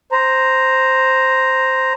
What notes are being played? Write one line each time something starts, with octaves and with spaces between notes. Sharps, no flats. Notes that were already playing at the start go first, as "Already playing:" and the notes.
C5 A#5